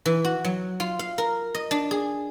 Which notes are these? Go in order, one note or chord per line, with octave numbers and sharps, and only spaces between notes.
E3
F#4
F#3
F4
F5
A#4
D#5
D4
G#4